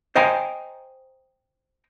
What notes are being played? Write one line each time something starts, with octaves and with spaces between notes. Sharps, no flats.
C5 D#5 G5 G#5 A#5